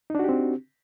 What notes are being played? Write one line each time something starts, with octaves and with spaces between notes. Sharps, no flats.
C4 D4 D#4 F#4 G4